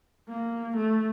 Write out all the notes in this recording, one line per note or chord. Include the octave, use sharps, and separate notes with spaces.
A#3
A3